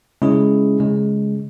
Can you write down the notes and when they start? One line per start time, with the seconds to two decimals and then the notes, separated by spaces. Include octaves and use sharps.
0.22 C#3 G#3 C#4 E4 G#4
0.80 C#3 G#3